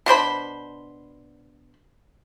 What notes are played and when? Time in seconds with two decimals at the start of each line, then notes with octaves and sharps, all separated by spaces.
0.06 B2 D4 C5 B5